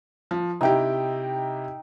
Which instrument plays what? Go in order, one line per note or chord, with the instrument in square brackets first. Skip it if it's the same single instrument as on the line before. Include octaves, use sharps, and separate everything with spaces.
[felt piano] F3
[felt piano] C3 E4 G4 [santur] D#4 G5